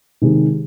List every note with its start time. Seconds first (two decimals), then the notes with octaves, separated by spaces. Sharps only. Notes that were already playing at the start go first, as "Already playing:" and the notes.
0.22 C3 D#3 G#3 C4 D#4